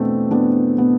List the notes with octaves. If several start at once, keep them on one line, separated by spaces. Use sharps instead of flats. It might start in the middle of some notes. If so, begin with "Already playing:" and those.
Already playing: E2 B2 A3 B3 C4 D4
E2 B3 D4
B2 B3